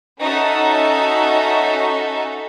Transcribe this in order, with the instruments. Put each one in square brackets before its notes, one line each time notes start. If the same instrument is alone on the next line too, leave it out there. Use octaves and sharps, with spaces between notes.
[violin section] C#4 D#4 F#4 A4 E5 A5